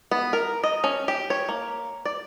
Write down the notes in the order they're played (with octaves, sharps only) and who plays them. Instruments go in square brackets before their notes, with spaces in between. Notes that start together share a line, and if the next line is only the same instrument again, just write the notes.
[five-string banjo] B3
A#4
D#5
C#4
G4
C#5
A#3
D5